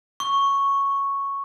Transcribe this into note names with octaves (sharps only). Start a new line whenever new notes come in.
C#6